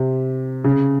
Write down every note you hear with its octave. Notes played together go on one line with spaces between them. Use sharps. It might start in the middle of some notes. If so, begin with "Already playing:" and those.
Already playing: C3
C#3